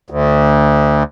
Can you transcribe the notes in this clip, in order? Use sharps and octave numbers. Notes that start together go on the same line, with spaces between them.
D2